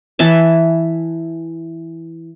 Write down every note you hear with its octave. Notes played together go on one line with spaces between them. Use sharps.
E3 E5 A5